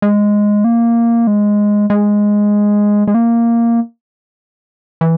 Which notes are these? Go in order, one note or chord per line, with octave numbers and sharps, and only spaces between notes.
G#3
A#3
G#3
G#3
G#3
A#3
E3